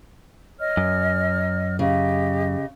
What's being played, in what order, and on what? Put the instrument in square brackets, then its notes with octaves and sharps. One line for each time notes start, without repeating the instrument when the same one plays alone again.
[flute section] C#5 D#5 F6
[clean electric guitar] F#2
[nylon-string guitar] C#3 [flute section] G4 D#5